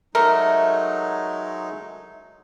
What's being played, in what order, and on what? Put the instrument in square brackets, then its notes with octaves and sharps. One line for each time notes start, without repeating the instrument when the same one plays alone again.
[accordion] F#3 G#3 D#4 [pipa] A3 [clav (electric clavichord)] A#4